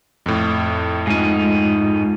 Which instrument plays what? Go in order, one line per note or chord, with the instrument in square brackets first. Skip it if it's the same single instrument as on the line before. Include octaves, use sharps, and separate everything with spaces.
[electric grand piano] F2 A2
[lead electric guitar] G#2 D#4 [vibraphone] G#3 F4